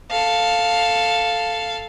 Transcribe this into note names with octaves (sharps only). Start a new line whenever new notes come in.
A4 F5